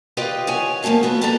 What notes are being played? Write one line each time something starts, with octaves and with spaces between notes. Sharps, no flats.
F4 G4 B4 D#5 F5 G5
C#5 F#5 G#5
E2 F3 F#3 A3 A#3
B3 F#4
B2 A#3 B3 G4 A4 A#5